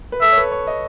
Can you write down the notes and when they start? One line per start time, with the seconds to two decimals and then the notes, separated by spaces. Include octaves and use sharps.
0.12 B4
0.22 A4 E5
0.32 C#5
0.37 B4
0.52 C#5
0.67 D#5